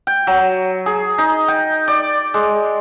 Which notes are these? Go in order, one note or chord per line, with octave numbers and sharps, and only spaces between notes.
G5
F#3
G#4
D#4
G5
D5
G#3